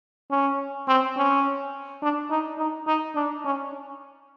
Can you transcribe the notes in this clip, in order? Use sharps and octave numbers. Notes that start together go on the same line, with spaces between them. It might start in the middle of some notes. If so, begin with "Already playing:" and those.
C#4
C4
C#4
D4
D#4
D#4
D#4
D4
C#4